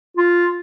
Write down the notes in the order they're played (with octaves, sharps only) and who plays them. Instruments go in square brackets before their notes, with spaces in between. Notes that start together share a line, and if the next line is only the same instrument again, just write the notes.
[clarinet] F4